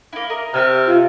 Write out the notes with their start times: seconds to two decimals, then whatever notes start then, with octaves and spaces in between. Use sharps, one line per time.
0.13 A#3 E4
0.30 A#4 D#5
0.54 C3 E5 E6 F6
0.86 F4